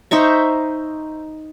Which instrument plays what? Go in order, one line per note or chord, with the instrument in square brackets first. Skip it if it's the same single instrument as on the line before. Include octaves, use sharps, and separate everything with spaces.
[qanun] D#4 C5 E5 C#6